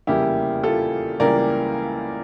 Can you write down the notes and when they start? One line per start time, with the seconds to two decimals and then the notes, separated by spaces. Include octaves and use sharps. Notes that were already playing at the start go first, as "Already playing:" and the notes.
0.07 F1 E2 C#3 G3 A#3 E4 G4
0.63 F4 A4
1.20 C#2 C#3 E3 G3 A#3 A#4 D5